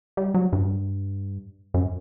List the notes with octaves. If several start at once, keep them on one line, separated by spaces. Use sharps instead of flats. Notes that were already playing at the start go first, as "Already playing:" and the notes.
G3
F#3
G2
F#2